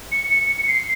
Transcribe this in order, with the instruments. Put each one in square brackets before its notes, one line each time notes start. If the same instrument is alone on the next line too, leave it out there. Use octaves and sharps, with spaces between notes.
[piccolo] C#7
C#7
C#7
C#7
C7